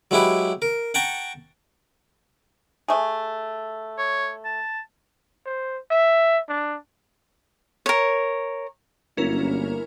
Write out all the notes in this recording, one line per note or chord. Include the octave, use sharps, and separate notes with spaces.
F#3 G#3 E4 G4 B4
A#4
F#5 G5 A5 A#5 C#6
A3 G#4
C#5
A5
C5
E5
D4
A#4 C#5
G1 F#2 A#3 C#4 E4 A#4